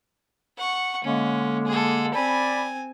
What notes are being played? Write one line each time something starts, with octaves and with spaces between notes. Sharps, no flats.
F#5 C#6
D3 G#3 A#3 C#4
G#4 A4
C4 D5 G#5 B5